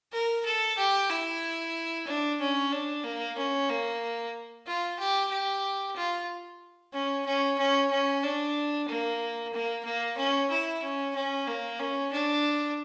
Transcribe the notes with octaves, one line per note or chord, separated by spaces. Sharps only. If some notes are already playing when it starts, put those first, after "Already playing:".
A#4
A4
G4
E4
D4
C#4
D4
A#3
C#4
A#3
F4
G4
G4
F4
C#4
C#4
C#4
C#4
D4
A#3
A#3
A#3
C#4
E4
C#4
C#4
A#3
C#4
D4